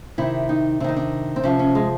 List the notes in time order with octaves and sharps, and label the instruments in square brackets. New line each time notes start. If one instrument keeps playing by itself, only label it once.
[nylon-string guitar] C3 D#3 E4
D#4
C3 D4
D#3 D#4
D4
C4
C3 F3 C#4
C#4
G#3